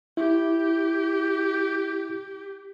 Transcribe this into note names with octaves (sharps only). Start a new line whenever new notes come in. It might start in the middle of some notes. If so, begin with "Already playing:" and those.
E4 G4